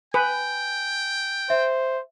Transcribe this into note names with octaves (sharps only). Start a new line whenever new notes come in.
B4 G5 G#5
C5 E5